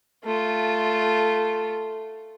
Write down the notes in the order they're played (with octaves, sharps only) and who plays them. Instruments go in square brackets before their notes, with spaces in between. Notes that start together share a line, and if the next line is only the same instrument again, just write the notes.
[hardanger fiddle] A3 F4